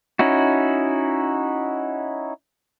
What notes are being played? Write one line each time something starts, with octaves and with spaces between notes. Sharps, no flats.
C#4 D#4 E4 F#4